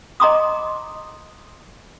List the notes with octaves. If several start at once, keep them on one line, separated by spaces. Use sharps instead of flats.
D#5 G#5 A#5 C6 D6 D#6